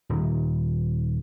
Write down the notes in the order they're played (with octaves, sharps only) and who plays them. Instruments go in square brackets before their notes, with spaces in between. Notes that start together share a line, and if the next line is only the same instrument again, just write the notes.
[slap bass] D#1